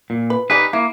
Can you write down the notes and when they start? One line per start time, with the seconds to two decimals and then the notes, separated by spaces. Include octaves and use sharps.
0.10 A#2
0.30 B4
0.50 D#4 G4 G#4 B4 D5
0.73 A#3 E4